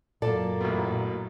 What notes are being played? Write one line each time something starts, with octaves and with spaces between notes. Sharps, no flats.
F#2 A#2 F#3 A#3 A4 D5 A5
A1 B2